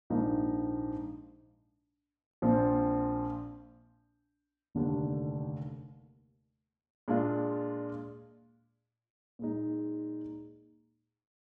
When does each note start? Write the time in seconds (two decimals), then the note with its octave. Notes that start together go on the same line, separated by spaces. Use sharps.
0.10 A#1 G#2 F3 A#3 D#4
2.42 A#1 A#2 F3 C4
4.75 F1 D#2 D3 G3 D4
7.08 A#2 G#3 D4 F4
9.39 A#2 G#3 D#4